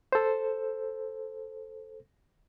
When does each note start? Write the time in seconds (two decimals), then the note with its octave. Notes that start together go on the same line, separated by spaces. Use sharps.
0.12 A4 C5